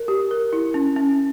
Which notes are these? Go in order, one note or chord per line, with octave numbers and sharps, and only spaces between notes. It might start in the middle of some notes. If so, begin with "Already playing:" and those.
Already playing: A#4
G4
A#4
E4
C#4
C#4